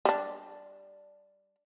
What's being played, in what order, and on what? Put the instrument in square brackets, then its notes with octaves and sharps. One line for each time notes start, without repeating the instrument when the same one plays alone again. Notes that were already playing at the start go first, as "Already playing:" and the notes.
[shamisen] G3 D4